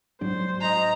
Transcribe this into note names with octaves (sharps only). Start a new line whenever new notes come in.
G#2 F#3 D4 C5
D#5 A#5